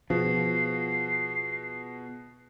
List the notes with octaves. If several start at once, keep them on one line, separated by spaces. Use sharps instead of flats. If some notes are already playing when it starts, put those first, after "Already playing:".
B2 F3 F4 G#4 B4 C7